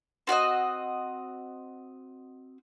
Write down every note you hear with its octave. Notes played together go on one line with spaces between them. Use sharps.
C4 F#4 D5 D#5